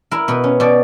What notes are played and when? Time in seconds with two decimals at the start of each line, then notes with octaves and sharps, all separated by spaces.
0.11 E4 A#4
0.28 B2 B4
0.44 C#4
0.60 B2 D5